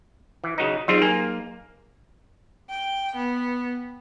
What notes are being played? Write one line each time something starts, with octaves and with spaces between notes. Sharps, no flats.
E3
C#3 F#3 D#4
F#3 G3 C4 D#4 F4 G#4
A#3 G#5
G5
B3